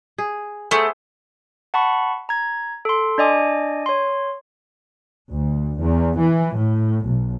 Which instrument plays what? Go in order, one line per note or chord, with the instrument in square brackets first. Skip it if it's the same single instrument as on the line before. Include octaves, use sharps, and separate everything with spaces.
[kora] G#4
[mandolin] A3 [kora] B3 G#4 C5
[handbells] F#5 A5 B5 C#6
A#5 G#6
A4 C6
D4 D5 D#5 G#5 D6
C#5 C6
[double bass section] D2
E2
E3
A2
B1